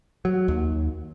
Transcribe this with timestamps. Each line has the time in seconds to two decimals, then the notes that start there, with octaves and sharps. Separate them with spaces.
0.25 F#3
0.48 D#2